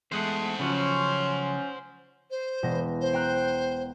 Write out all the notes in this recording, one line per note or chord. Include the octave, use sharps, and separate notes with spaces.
E2 G#3 A3 C5 F#5
C#3 F3 F#3 C#4
C5
E1 B3 A#6
C5
G5 A#5 F#6